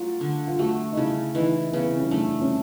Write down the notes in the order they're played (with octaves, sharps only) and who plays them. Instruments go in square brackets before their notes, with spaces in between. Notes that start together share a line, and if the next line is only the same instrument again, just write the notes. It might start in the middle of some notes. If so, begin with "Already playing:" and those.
Already playing: [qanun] F#3 A3 [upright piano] F4
[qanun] D3
[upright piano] F4
[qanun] A3 [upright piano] F#4
[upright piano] D#4
[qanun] C#3 [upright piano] E4
[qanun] E3 [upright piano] D#4
[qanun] C#3 [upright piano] B3
[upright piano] C4
C#4
[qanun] A3 [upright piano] D4
[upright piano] C#4